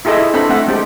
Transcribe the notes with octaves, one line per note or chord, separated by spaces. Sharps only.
E4 F4 G#4 A4 D#5 E5
E4
C4 D4 A4 B4 B5
A3 C4 E5 F#5
G#3 C4 G4